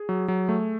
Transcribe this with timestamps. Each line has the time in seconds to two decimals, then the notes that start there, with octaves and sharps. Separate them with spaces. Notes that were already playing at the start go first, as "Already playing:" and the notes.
Already playing: G#4
0.09 F#3
0.28 F#3
0.49 A3